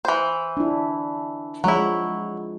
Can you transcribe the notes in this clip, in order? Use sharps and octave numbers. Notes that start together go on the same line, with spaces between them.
E3 C5
D4 E4
F3 F#3 G#3 E4